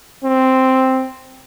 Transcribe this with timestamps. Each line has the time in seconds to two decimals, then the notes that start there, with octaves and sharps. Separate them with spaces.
0.24 C4